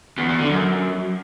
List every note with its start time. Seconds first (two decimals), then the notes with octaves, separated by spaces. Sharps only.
0.18 E2
0.28 E2
0.39 D3
0.50 F#2